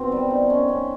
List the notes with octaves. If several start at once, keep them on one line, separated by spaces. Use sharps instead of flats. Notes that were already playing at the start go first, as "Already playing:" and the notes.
Already playing: B2 D#3 C4
G3
D#4
C#4
C#4